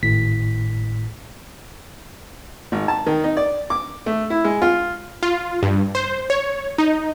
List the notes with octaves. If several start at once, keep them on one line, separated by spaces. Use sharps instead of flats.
G#1 A2 B6
G#1
A5
D#3
D#4
D5
D6
A3
E4
G#3
F4
F4
G2
C5
C#5
D#4